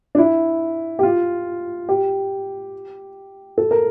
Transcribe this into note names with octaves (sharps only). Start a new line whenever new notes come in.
D4
E4
G4
F4
G4
A4
A#4